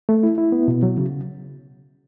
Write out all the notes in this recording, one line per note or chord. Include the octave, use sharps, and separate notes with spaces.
A3
E4
E4
B3
B2
F#3
C#3